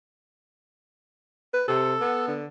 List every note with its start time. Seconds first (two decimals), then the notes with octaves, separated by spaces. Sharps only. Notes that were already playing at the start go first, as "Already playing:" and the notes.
1.53 B4
1.68 C3 A4
2.00 B3
2.28 D3